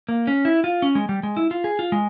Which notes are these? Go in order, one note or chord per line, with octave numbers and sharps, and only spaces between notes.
A#3
C#4
E4
F4
C#4
G#3
G3
G#3
E4
F4
G#4
F4
G#3